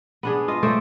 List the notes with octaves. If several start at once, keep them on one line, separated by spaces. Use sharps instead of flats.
B3 D4 G#4
F4 D#5
A3 C5 D5 E5